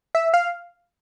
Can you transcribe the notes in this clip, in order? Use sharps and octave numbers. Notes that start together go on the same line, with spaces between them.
E5
F5